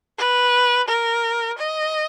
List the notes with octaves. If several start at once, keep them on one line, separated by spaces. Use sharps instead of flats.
B4
A#4
D#5